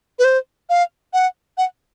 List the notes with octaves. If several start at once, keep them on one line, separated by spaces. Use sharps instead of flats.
B4
C5
F5
F#5
F#5